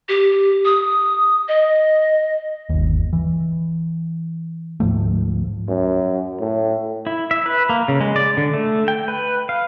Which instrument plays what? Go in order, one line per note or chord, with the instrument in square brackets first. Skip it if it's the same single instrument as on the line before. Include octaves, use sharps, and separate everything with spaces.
[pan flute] G4
D#6
D#5
[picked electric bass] G1 D#2
E3
D2 G#2 F3 A3
[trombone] F#2
A2
[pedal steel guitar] E4
E5
B4
A#3
C#3
G#3
D5
D3
A3
G5
B4
F5